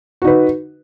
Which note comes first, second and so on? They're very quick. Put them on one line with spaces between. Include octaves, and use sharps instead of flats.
F#4 D#4 B4